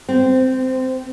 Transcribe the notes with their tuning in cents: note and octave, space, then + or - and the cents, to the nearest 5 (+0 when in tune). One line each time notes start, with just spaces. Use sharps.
C4 -15